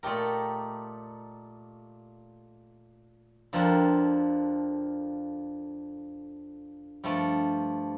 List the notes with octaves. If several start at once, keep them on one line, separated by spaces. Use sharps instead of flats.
A#2 A3 D#4 G4 A#4
F2 D3 F3 A#3
G2 F3 A3